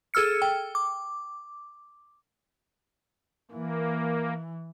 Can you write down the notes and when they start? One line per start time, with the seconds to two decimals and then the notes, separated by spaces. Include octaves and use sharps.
0.14 G#4 A4 E6 F6 C#7
0.42 G5
0.75 D6
3.52 E3 A#3